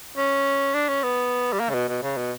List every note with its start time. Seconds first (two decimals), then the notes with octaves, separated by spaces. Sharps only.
0.17 C#4
0.74 D4
0.88 C#4
1.03 B3
1.52 G3
1.60 A#3
1.70 C#3
1.74 B2
1.89 B2
2.03 C#3
2.17 B2